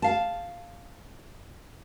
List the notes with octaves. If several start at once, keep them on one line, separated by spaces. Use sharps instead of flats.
F5 A5